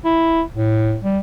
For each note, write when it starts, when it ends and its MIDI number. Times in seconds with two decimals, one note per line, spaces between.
0.04 0.42 64
0.56 0.97 45
1.04 1.19 55